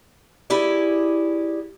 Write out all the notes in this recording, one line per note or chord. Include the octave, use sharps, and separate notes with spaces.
E4 G4 G#4 D5